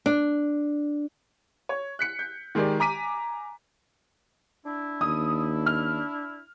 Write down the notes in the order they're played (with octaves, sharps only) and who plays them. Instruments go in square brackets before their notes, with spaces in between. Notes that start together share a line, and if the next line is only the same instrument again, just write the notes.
[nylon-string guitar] D4
[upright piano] C#5
F#6 B6 C#7
G6
D#3 G#3 G4 A#4 D5
G#5 A#5 D6 B6 D#7
[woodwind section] D4 E4
[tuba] D#2 [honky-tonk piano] D#6
[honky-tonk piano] F6